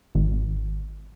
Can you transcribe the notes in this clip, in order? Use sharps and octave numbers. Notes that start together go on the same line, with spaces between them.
G#1